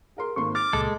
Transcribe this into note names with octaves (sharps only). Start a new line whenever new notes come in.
G#4 A#4 C6
G#1 A#3 C6 C#6
D6 F6 A6
C#2 A#2 G#3 A4